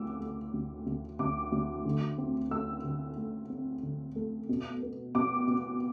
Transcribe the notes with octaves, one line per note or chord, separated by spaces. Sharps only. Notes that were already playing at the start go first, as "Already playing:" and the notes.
Already playing: D2 D3 A3 D6 E6
A3
D2
D2
D2 D6
D2
D3
C4
A3 E6
D3
A3
C4
D3
A3
B2
B3
B2 D6
B2